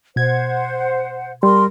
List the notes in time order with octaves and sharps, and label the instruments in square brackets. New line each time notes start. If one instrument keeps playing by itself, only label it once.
[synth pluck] B2 G#6 [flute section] C5 F#5
[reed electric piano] G3 [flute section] A#4 [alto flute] C6